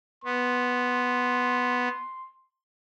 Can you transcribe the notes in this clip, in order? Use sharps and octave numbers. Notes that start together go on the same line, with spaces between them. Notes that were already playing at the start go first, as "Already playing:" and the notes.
B3 C6